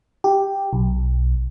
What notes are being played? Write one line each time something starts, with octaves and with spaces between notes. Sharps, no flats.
G4
B1